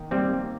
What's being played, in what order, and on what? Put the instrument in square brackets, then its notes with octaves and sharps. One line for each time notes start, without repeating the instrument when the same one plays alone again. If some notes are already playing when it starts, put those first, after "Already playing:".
Already playing: [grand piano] D#3 A#3
[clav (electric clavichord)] G3 C4 [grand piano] A#3